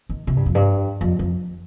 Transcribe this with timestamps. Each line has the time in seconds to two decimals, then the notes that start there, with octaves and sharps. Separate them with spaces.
0.09 D#3
0.27 C3
0.37 G2
0.46 F2
0.55 G2
1.01 F2
1.19 F2